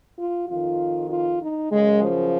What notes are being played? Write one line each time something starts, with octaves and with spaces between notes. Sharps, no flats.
F4
F2 D#3 F4
F4
D#4
F#2 C#3 G#3
F3